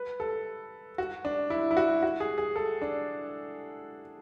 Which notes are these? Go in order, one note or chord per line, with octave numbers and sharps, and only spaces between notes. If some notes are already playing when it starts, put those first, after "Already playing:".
Already playing: B4
A4
F#4
D4
E4
E4
F#4
F#4
G#4
G#4
A4
D4